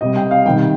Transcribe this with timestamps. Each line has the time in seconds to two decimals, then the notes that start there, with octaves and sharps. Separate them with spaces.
0.01 C3 G3 D#5
0.16 G5
0.31 F5
0.45 C3 D#3 G3 G5